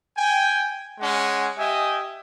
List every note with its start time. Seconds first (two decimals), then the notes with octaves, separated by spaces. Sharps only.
0.17 G5 G#5
1.00 G#3 C#4 F#5
1.57 G4 D#5 E5 G#5